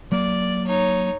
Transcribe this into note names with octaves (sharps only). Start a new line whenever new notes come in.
F#3 A#3 D5
D#4 C#5